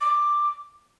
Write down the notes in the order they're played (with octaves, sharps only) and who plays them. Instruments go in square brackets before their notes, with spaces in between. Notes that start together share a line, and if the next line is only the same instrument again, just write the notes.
[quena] D6